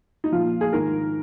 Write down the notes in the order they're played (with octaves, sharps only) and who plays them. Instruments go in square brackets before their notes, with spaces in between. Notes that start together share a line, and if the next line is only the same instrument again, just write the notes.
[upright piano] D#4
A#2 F3 F4
G#4
G#2 D#3 A#4